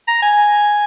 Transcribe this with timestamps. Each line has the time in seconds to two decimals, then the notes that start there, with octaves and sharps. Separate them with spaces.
0.08 A#5
0.23 G#5